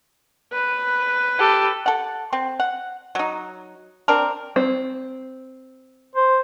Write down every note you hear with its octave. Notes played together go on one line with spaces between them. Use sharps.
B4
G4 A4
A4 F#5
C4
F#5
F#3 D#4
C4 D4 A#4
C4
C5